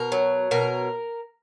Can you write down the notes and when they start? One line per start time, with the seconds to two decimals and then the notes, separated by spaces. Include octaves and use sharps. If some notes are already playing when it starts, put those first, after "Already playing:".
Already playing: B2 A#4
0.12 F#3
0.51 B2 A#4